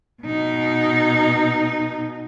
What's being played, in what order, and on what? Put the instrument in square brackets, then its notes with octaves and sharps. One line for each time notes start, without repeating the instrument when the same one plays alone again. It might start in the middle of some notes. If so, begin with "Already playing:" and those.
[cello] B2 D#4